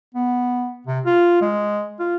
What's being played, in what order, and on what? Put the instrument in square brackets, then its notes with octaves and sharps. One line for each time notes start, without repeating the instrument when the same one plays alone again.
[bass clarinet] B3
C3
F4
G#3
F4